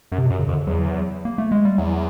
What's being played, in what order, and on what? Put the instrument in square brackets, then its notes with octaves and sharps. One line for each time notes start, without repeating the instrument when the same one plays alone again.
[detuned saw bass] F#2
[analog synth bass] C3
B2
[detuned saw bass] F#2
[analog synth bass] C#3
[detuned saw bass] F2
[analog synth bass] D3
[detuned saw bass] E2 [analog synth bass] F#3
[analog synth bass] A#3
A3
G#3
G3
[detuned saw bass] E2 [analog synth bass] F#3